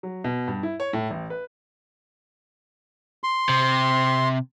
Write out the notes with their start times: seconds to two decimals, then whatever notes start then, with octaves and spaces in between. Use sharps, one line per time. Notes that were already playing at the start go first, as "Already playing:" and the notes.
0.03 F#3
0.24 B2
0.48 G2
0.63 E4
0.80 C#5
0.93 A2
1.10 A1
1.30 B4
3.24 C6
3.49 C3